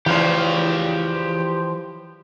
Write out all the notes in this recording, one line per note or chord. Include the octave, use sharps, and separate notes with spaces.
E2 C#3 E3 F3 G4 F5